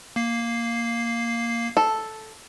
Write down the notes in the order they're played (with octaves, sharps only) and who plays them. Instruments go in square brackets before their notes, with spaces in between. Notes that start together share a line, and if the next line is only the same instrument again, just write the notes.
[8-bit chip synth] A#3 C7
[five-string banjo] A4